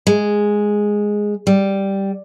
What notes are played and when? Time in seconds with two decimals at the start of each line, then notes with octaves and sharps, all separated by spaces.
0.07 G#3
1.47 G3